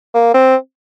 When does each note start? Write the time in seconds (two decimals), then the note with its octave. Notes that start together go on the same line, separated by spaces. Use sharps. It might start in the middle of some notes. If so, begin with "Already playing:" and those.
0.14 A#3
0.34 C4